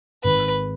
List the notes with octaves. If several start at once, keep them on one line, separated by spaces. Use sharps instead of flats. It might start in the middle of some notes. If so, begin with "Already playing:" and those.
G#1 G#2 D#3 B4